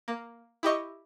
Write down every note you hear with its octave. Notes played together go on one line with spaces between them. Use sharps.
A#3
E4 G4 D#5 C#6